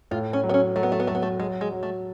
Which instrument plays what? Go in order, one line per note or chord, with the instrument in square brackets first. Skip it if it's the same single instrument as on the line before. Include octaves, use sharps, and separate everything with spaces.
[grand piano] A2 [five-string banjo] F4
[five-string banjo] C#4
[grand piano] F#3
[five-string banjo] B3
C#4
[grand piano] F#3 [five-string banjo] A3
[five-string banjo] B3
A3
B3
[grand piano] F#3 [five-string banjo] A3
[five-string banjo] B3
A3
[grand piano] F#3 [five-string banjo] G#3
[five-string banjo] G#3
[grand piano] F#3
[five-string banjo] A3